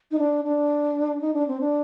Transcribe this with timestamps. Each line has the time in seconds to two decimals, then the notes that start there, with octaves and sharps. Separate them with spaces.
0.11 D#4
0.19 D4
0.45 D4
1.21 D#4
1.33 D4
1.48 C4
1.60 D4